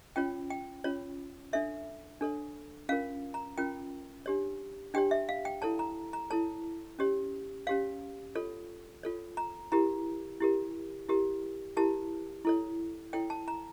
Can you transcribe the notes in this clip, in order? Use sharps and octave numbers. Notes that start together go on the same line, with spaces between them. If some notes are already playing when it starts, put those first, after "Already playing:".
C#4 F4 C#5 G5
G5
C#4 F4 C#5
D4 A4 C#5 E5
D4 A4 C#5
C#4 F4 A#4 F5
A#5
C#4 F4 A#4 G5
D4 G4 C#5
D4 G4 C#5 G5
E5
F5
G5
E4 A4 C#5 A5
A#5
A#5
E4 A4 C#5 A5
C#4 G4 C#5
C#4 G4 C#5 F5
F4 A4 C#5
F4 A4 C#5
A#5
E4 G4 A#4 A#5
E4 G4 A#4
E4 G4 A#4
E4 G4 A#4 A5
E4 A4 C#5
E4 A4 C#5 G5
A5
A#5